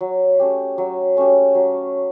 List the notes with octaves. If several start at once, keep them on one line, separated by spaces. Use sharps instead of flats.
F#3
A3 C#4 G4
F#3
A3 C#4 G4
F#3